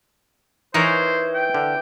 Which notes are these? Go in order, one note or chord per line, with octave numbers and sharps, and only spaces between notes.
E3 D#4 A#4 C5 C#5
G5
D3